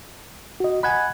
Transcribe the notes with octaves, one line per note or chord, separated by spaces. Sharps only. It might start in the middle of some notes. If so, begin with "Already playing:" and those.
F#4 D#5
D#5 F#5 G#5 B5 F#6 G#6